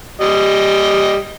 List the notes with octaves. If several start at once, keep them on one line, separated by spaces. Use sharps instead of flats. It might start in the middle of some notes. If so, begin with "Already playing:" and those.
G3 D#5